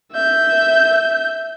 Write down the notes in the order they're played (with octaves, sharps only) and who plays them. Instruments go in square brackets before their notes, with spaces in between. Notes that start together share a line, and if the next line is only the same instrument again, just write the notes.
[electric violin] E5 G6